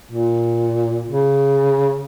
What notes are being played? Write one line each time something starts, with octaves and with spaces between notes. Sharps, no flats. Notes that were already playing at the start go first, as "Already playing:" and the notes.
A#2
C#3